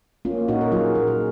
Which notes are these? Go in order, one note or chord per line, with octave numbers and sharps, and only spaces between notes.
A#3 C#4 F4
A#2 D#4 F#4
A#4
F#3 F4 G#4
A#2 A#4
G#4